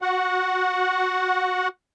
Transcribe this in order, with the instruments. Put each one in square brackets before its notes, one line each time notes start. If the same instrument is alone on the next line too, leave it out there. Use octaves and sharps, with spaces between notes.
[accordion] F#4 F#5